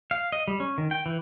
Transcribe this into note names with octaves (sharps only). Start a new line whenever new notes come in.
F5
D#5
G3
C#4
D#3
G5
E3